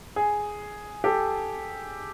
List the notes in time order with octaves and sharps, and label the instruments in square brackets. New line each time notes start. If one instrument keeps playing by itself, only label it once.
[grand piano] G#4
G4 A4